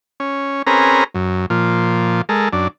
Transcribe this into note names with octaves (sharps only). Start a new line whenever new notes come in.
C#4
C4 C#4 G#4 A#4 B4 A#5
F#2
A#2 F3
G#3 A4 A#4
F#2 D4